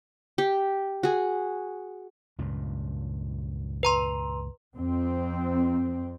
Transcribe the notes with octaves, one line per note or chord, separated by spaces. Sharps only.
G4
F#4 G#4
C#2 G2 A#2
B4 A#5 C6
F2 C4